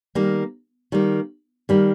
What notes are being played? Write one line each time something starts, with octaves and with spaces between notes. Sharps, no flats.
D#3 G3 A#3
D#3 G3 A#3
D#3 G3 A#3